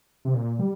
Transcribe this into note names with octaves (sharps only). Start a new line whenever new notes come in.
C3
A#2
G3